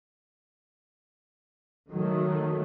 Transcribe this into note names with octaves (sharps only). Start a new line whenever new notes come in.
D#3 F#3 A3